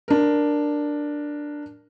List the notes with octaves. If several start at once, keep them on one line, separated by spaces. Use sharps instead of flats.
D4 A#4